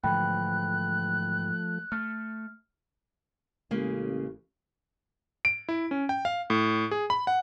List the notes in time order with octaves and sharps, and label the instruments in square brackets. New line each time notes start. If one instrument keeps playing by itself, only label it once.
[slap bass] G#2 D3 E3 [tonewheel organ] F3 A3 [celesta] G5 B5 [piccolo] F#6
[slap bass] A3 [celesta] F6
[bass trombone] A1 [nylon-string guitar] C#3 G#3 A#3
[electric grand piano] D7
E4
C#4
G5
F5
A2
G#4
B5
F#5